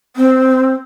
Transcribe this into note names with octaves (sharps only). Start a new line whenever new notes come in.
C4